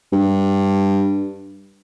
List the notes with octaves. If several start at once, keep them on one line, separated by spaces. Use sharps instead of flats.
G2